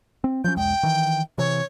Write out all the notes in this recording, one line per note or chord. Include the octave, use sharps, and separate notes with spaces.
C4
F3 F#3 C#4 G6
B1 E2 G#3 G5
D#3 E3
C3 E3 C#5